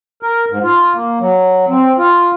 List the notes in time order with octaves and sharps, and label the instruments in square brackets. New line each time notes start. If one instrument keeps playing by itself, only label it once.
[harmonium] A#4
G#2
F4
A#3
F#3
C4
F4